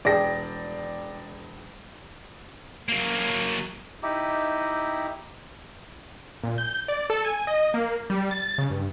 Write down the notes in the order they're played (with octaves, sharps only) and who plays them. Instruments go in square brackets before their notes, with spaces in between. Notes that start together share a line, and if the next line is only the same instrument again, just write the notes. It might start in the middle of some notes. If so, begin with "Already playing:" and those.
[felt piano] E1 G#4 G5 [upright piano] D5 A#6
[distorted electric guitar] F#3 A#3
[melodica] D#4 E4 G4
[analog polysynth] A#2
G6
D5
A4
G#5
D#5
A#3
G3
A6
C#3
G2